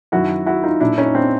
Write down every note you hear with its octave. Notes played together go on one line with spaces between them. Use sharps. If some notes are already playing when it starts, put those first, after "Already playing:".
F#2 D#3 F#3 E4 F#4
E4 F#4
D#4 F4
A#2 F#3 D4 E4
C#4 D#4
C4 D4